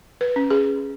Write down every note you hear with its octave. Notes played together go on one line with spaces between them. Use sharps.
B4
C#4
G#4